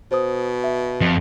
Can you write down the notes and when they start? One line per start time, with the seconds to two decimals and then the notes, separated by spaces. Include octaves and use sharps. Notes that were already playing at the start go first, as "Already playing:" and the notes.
0.11 B2 C5 D#6
0.64 E5
1.01 F2